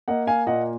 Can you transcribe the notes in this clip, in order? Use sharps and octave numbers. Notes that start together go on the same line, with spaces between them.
A#3 D#5 F#5
F5 G#5
A#2 D#5 F#5